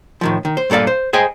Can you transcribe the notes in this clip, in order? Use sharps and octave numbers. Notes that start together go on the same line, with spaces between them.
A2 D#3 F3
D#3
C5
G2 A#2 A4 D5 F5
C5
G#4 C5 D#5 G5 G#5